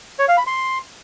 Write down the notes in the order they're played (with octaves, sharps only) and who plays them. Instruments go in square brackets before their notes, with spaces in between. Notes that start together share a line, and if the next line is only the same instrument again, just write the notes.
[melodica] C#5
F5
B5
C6